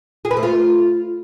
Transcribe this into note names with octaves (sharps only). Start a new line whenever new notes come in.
G#4
B4
A3
F4